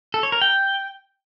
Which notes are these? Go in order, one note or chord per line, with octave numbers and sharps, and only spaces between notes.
A4
C#5
A#4
G5